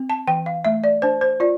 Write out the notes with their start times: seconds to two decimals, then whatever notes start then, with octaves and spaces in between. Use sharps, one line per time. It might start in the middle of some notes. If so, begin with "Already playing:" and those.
Already playing: C4
0.10 A5
0.28 E3 G5
0.46 F5
0.65 A3 E5
0.84 D5
1.02 D4 C5
1.21 C5
1.40 F4 D5